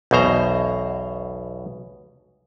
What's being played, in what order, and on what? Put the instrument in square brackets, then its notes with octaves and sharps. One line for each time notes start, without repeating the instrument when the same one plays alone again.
[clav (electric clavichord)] B1 E2 B2 C5 A#5